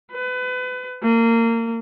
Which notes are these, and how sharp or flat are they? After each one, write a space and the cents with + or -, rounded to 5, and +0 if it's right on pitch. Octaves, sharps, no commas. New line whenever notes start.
B4 +30
A#3 -25